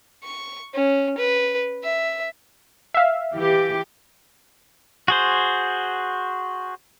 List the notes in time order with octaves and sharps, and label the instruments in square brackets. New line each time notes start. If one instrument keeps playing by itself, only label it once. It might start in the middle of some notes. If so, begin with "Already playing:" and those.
[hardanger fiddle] C#6
C#4
B4
E5
[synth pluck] E5 F5
[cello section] E3 G4
[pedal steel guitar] F#4 G#4 C5